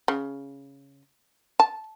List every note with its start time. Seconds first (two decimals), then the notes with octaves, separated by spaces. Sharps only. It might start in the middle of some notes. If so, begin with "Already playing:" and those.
0.08 C#3
1.60 A5